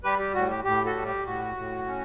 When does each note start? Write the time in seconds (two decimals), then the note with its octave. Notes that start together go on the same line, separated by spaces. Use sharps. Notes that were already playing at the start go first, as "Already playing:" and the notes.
0.04 G3 G4 B4
0.19 G4
0.34 A2 F#4
0.50 G4
0.65 A2 G4
0.85 F#4 A4
0.96 G3
1.06 G4
1.26 A2 F#4
1.57 A2
1.87 C#4